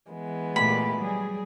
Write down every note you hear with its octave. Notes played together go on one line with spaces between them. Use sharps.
E3 G#3 B3
A#2 A3 G4 B5
F#3 G3 G#4